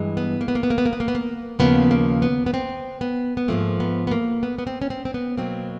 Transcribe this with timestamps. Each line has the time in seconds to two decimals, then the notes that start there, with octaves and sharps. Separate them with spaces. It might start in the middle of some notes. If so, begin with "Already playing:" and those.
Already playing: G2 E3 G#3
0.17 B3
0.41 A#3
0.48 B3
0.55 A#3
0.63 B3
0.70 A#3
0.78 B3
0.86 A#3
0.93 B3
1.00 A#3
1.08 B3
1.15 A#3
1.59 D#2 C#3 F3 A#3 B3
1.91 A#3
2.22 B3
2.46 B3
2.54 C4
3.01 B3
3.37 B3
3.48 G#2 F3 A3 A#3
3.80 B3
4.07 B3
4.11 A#3
4.43 B3
4.58 B3
4.67 C4
4.82 C#4
4.90 C4
5.05 C4
5.14 B3
5.37 B2 F#3 A#3 C4